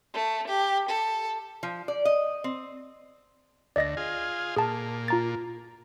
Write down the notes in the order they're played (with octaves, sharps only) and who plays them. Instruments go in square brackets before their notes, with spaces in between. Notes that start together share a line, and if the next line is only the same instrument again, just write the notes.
[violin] A3
G4
A4
[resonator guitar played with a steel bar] F3
D5
D#5
C4
[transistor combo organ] D2 [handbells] D5 D#5 A#6
[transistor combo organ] F4 G#4
[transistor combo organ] A#2 [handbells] G#4 A5
[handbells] F4 A#5 A6